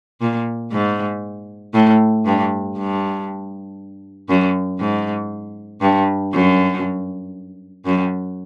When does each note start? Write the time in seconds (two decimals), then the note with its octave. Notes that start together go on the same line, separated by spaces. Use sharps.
0.21 A#2
0.72 G#2
1.74 A2
2.26 G2
2.77 G2
4.29 F#2
4.80 G#2
5.81 G2
6.33 F#2
7.86 F#2